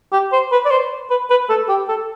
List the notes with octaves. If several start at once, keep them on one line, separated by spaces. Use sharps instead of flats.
G4
C5
B4
D5
C5
B4
B4
A4
G4
A4